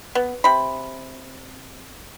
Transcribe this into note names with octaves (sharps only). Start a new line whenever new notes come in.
B3
C3 B5